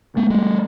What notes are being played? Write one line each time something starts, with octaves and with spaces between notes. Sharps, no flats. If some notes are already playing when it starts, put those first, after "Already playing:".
G#3 A#3
G3 A3